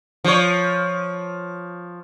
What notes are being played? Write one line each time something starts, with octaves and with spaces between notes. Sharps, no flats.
F3 C#5